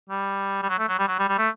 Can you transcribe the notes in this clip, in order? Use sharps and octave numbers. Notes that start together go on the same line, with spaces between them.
G3
G3
F#3
A3
F#3
G3
F#3
G3
G3
A3